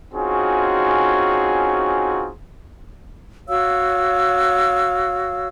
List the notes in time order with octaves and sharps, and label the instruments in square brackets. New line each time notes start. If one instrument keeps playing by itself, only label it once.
[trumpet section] C4 C#4 D#4 F4 F#4 G#4
[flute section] F#4 C#5 F5 E6